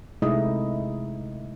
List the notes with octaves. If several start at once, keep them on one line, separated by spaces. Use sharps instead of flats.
C3 G#3 A3 D#4 E4 D#5